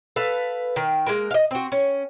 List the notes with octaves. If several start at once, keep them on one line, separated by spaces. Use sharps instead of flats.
A4 B4 F5
D#3
G#3 A#3 A#4
D#5 F5
C4 F#4
C#4